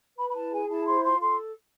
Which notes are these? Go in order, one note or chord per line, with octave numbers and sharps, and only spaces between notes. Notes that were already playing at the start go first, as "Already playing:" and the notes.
B4 B5
B5
E4 A5
G#4 G#5
E4 A5
C5 C6
F4 C6
A4 C6